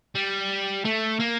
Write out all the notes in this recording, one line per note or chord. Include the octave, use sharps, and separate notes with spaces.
G3
A3
A#3